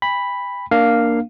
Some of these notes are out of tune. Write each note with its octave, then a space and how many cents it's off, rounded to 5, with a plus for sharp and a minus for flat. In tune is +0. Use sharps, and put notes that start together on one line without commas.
G5 +45 B5 +0
A#3 +0 D4 +10 F5 +0